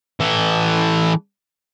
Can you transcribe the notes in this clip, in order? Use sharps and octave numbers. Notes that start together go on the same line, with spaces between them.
E3 A4